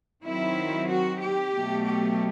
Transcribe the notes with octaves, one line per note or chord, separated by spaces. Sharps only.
D#3 F#3 C4 E4
F#4
G4
B2 F#3 A3
G4